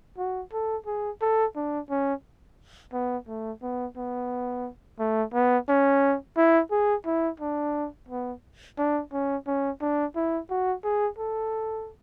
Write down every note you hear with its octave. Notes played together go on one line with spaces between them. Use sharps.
F#4
A4
G#4
A4
D4
C#4
B3
A3
B3
B3
A3
B3
C#4
E4
G#4
E4
D4
B3
D4
C#4
C#4
D4
E4
F#4
G#4
A4